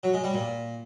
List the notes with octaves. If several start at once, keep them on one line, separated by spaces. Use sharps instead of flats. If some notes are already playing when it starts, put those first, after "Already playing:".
F#3
G#3
G3
A#2